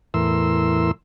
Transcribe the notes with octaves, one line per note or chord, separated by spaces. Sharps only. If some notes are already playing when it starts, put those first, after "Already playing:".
E2 A2 E3 A#4 C6 E6